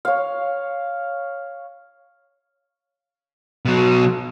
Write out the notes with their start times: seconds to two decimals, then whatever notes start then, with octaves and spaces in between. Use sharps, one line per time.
0.05 C#5 F5
3.65 B2 F#3